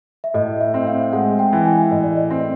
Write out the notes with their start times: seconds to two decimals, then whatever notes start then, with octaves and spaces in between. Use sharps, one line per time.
0.24 E5
0.34 A2 D#5
0.61 E5
0.74 C4
0.87 F5
1.13 G#3 F#5
1.39 G5
1.53 E3
1.65 G#5
1.91 A2 D#5
2.04 D5
2.17 D#5
2.31 C4